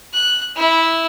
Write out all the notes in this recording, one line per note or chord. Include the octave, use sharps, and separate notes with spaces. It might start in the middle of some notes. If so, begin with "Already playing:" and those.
F#6
E4